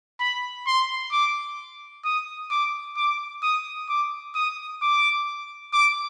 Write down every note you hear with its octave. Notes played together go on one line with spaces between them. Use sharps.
B5
C6
D6
D#6
D6
D6
D#6
D6
D#6
D6
D6